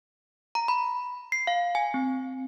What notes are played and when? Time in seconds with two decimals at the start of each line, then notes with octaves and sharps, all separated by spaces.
0.55 A#5
0.68 B5
1.32 C7
1.47 F5
1.75 G#5
1.94 C4